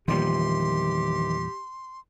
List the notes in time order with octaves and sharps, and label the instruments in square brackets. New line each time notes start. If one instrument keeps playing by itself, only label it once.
[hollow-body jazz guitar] E2 A#2 G3 [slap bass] D#3 F3 [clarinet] G4 [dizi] C6